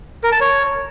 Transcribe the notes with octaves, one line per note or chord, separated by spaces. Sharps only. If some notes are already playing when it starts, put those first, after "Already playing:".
A#4
A5
C#5